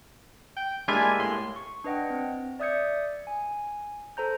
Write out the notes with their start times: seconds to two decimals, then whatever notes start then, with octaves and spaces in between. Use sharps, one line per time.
0.56 G5
0.88 G#3 A#3 D4 E4 F4 G4 G#5
1.19 A2 C6
1.56 C#6
1.84 D4 B4 D#5 F#5 G5
2.10 C4
2.60 D5 E5 D#6 G6 G#6 C#7
3.27 G#5
4.17 A4 C5 A#5 G6